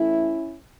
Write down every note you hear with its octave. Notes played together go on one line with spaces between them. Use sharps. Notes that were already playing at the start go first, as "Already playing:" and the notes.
Already playing: A2 E3 A3 C#4 E4